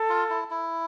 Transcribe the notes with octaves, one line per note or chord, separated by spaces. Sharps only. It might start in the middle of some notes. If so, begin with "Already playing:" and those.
Already playing: A4
F4
E4
E4